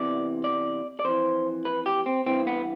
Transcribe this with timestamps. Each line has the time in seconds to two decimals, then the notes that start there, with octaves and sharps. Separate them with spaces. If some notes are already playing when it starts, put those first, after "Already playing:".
Already playing: E2 C3 E3 D5
0.44 D5
0.99 D5
1.05 F2 E3 C5
1.65 B4
1.86 G4
2.06 C4
2.26 G2 E3 C4
2.47 B3